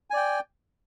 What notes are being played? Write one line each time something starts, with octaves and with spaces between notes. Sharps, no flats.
D5 G5 G#5